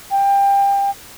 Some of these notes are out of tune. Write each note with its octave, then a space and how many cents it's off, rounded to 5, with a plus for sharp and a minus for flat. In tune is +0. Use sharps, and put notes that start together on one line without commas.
G5 +25